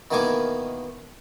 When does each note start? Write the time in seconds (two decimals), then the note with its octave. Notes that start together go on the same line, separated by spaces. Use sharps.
0.11 B2 D#3 E3 A#3 G#5 D6